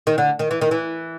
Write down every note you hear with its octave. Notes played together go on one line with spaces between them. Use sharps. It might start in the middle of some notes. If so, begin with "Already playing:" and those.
D#3
D3
D#3
E3
D#3
E3